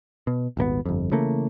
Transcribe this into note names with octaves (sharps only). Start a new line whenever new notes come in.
B2
D#1 G#1 A#3 B3
G1 F2
C#3 E3 A3 A#3